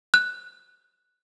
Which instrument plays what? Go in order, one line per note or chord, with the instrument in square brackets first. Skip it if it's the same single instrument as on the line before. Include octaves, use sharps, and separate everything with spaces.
[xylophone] F#6